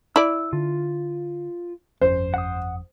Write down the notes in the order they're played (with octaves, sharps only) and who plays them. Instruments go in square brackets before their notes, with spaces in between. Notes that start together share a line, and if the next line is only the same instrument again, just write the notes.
[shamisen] E4 D5 [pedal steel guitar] E6
[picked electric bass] D3 [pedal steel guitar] F4
[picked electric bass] G1 F2 C#4 [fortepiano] C5
[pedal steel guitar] F#5 D#6